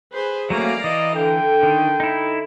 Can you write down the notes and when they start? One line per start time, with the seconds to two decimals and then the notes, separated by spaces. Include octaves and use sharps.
0.13 G#4 B4 C5
0.50 F#3 A3 A#3 C#4 D5 F5 A#5
0.84 E3 D#5
1.16 D3 G5
1.63 D#3
2.00 D#4 E4